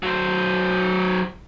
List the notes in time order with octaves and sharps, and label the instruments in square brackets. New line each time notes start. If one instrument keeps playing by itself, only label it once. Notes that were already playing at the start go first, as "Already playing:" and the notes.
[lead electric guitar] F#3 C5